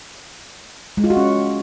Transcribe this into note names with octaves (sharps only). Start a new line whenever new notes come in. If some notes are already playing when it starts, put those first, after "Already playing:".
G#3
F4
F#4
C#4